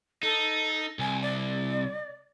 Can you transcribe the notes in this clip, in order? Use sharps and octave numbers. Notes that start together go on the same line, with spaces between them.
D#4 A4
C2 G#5
D5